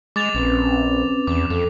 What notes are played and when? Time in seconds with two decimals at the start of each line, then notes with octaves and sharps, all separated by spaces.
0.16 G#3 D6 A6 F7
0.35 A#1 C4 C#4 B4
1.27 E2 D6
1.50 F2 A4